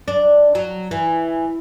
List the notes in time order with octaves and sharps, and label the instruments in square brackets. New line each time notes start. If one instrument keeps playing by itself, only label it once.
[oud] D4
F#3
E3